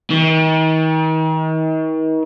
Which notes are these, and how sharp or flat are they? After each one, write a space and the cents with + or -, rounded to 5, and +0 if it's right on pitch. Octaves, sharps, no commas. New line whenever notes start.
D#3 +40